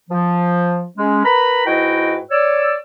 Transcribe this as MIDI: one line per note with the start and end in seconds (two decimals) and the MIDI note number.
0.10 0.84 53
0.97 1.22 56
0.97 1.22 61
1.24 1.63 70
1.24 1.63 71
1.24 1.63 82
1.24 1.63 83
1.66 2.19 44
1.66 2.19 64
1.66 2.19 66
1.66 2.19 71
1.66 2.19 75
1.66 2.19 79
2.31 2.76 73
2.31 2.76 74
2.31 2.76 88